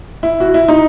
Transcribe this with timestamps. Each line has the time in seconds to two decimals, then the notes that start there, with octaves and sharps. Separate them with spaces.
0.23 E4
0.40 F#4
0.54 E4
0.68 D#4